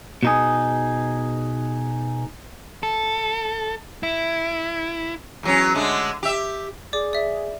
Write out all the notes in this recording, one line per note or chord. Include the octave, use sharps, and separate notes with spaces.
B2 D#4 G#4
A4
E4
E2 F#3 C#4
D3 G#3 A3
G4 E5
G#4 D5 D6
D5 E5